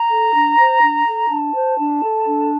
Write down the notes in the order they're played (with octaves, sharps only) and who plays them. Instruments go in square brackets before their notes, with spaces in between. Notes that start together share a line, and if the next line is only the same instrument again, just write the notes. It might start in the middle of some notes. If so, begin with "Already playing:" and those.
Already playing: [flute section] A#5
A4
D4
C5
D4
A4
D4 A5
C5
D4
A4
D4